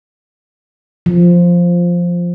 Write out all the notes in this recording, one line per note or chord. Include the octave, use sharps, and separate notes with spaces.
F3